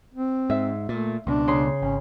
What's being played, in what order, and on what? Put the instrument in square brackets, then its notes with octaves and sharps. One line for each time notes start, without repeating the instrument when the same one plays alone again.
[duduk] C4
[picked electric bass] G#2 [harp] E5
[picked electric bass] A#2 [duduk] A3
[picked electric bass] C#2 B2 [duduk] D4
[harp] C#3 C6
[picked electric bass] G#1 [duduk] C#4